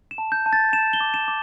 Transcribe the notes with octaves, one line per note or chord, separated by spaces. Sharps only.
E7
A5
G6
A5
A6
A5 E7
G7
D6
E7
D6